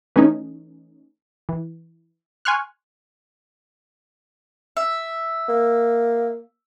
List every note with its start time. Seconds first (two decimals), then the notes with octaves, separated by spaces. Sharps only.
0.16 E3 A3 C#4 D#4
1.49 E3
2.45 G#5 C6 C#6 F6 F#6
4.77 E5
5.49 A#3